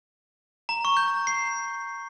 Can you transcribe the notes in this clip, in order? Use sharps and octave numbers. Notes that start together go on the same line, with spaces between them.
A#5
C#6
G6
C7